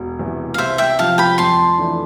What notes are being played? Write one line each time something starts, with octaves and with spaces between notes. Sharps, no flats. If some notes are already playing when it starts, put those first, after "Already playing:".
Already playing: E1
E2 C3
F5
C2 C5 E5
E5 G5
C3 F3 F5 A5
G5 B5
F2 A5 C6
E3 A3 D4